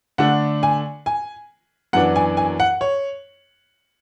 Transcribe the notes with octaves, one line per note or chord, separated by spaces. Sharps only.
D3 A3 D4 F#5
G#5
G#5
F#2 E3 B3 D4 F#5
G#5
G#5
F#5
C#5